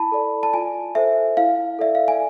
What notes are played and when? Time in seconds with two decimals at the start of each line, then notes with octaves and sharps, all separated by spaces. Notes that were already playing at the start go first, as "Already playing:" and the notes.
Already playing: E4 A5 B5
0.12 A4 D5
0.43 A5
0.54 F4 G#5
0.95 A4 C5 E5
1.37 E4 F5
1.79 A4 D5 E5
1.95 F5
2.08 G#5